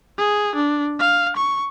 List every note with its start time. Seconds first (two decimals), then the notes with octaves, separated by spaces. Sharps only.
0.18 G#4
0.55 D4
0.99 F5
1.36 C#6